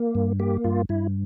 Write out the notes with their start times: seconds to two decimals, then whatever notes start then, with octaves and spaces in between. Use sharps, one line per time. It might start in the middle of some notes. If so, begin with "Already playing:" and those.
Already playing: A#3
0.15 G2
0.40 A#3 G4
0.64 G2 F4
0.89 G2 E4